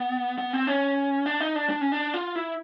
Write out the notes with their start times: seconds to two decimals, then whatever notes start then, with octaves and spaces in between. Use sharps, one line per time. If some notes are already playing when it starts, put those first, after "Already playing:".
Already playing: B3
0.38 B3
0.53 C4
0.67 C#4
1.26 D4
1.41 D#4
1.56 D4
1.70 D4
1.81 C#4
1.92 D4
2.14 F4
2.35 E4